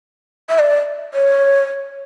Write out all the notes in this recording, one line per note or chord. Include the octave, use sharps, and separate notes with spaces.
E5
D5
C#5